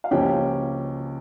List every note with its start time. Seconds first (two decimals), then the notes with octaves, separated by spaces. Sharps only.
0.04 F5
0.11 C#2 C#3 F3 A#3 C#4 G4 G5